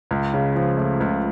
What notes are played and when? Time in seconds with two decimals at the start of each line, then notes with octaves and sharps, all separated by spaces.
0.11 C#2
0.34 C#3
0.55 F3
0.77 A3
1.00 C#2